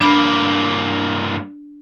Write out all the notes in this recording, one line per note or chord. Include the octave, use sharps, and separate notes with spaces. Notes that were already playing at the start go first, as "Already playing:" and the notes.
G2 A#3 D4 B5